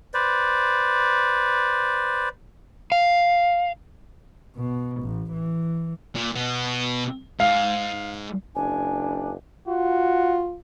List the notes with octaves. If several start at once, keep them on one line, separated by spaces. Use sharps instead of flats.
B4 C5 D5
F5
B2
A1
E3
A#2
B2 B3
G#2 F5
F#1 D4 G#5
F4 F#4